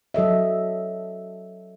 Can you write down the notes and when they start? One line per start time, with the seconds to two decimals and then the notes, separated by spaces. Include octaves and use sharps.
0.14 F#3 A4 D#5 E5